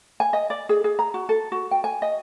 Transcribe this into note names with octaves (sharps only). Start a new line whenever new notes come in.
G#5
D#5
D5
G#4
G#4
A#5
F#4
A4
F#4
G5
G#5
D#5